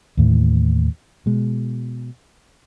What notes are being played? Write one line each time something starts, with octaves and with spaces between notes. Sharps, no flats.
D#2 A2 E3
B2 G#3